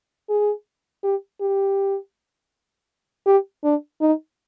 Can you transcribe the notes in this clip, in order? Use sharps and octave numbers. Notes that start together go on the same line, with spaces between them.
G#4
G4
G4
G4
D4
D#4